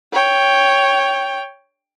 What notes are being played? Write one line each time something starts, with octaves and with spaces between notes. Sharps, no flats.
C#5 G5